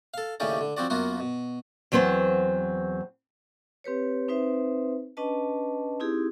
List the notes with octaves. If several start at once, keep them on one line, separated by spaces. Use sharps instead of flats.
A4 F5
D#2 A2 C#3 C#4 G4 D5
D3
F3 C4 F#4 D5
F#2 A#3 B3 F4 F#4
B2
E2 F#3 C4 B4 C5
C4 G4 B4 C#5
C4 D#4 B4 C5 E5
C#4 D4 B4 D#5 A5
C4 D#4 E4 G4 G#4